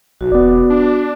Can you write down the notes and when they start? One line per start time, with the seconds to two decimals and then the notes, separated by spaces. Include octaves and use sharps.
0.21 B1 F#4
0.32 E1 B3 D5
0.70 D4